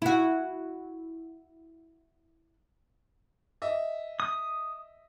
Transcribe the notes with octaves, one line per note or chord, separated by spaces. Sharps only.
E4 F#4
D#5 E5
D#6